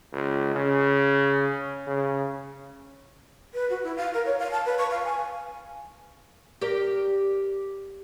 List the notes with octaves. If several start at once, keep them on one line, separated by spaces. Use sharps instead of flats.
C#2
C#3
C#3
B4
F#4
E4
F5
A#4
C#5
F5
A5
B4
C#6
F5
G#5
G4 A#4 D5